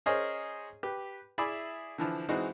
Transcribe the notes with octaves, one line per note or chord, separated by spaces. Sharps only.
C#4 G#4 A#4 C5 C#5 D#5
G4 B4
E4 G#4 D5 E5 B5 D6
D3 E3 F3
E3 G#3 C4 D#4 F#4